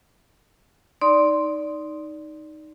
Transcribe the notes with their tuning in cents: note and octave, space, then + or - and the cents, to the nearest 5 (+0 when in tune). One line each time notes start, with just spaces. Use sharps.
D#4 +0 D5 -10 C6 +0